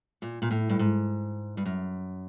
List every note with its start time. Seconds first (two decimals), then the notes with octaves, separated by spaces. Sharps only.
0.22 A#2
0.42 A#2
0.51 A2
0.69 G2
0.79 G#2
1.57 G2
1.65 F#2